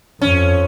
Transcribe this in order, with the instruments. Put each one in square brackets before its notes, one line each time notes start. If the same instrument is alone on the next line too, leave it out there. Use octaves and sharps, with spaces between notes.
[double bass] F2 [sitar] C#4